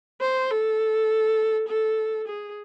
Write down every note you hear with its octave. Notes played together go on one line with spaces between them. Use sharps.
C5
A4
A4
G#4